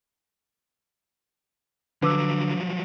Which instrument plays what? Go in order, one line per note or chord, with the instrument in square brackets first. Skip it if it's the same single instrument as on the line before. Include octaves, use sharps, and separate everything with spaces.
[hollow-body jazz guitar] D3 [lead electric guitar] F3 F#3 [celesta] B4 D6 E6